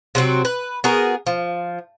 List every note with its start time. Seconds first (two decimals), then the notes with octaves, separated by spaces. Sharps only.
0.15 C3 F#3 C4 F#4
0.45 B4
0.84 B3 F#4 G#4 A#4
1.26 F3